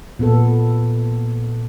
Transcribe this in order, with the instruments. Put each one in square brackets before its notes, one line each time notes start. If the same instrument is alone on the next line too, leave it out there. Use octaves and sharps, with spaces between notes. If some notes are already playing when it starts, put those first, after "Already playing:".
[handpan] A#2 B3 A4